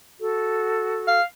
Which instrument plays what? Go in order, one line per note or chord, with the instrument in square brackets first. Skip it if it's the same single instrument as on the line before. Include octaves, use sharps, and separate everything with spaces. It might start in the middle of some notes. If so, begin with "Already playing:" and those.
[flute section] F#4 A4
[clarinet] F5